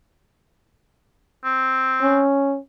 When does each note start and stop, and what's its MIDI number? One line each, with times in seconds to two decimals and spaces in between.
1.44 2.21 60
2.02 2.58 61